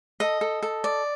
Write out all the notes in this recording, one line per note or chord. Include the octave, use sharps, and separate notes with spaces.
A4 D#5
A4
A4
D5